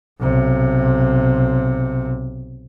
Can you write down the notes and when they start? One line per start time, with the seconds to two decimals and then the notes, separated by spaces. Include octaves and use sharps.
0.19 B1 C3